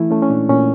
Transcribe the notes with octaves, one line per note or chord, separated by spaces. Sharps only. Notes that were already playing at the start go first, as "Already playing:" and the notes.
Already playing: E3 A3 E4
A3 C#4
C#4
A#2 D4
A#2 C#4